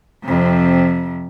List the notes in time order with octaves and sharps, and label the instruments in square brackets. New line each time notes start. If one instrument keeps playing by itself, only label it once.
[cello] F2 C3